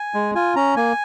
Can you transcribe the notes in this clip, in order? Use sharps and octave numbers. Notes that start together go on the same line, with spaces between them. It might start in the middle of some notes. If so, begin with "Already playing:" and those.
Already playing: G#5
G#3
F4 G#5
C#4 A#5
A#3 G#5